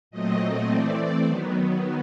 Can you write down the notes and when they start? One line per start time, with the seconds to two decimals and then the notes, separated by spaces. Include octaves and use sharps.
0.11 A#2 F#3 A3 C4 D#5
0.39 D#5
0.68 E3 A3 C4 D5
1.25 D#3 F#3 B3